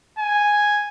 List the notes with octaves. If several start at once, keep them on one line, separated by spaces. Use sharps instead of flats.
G#5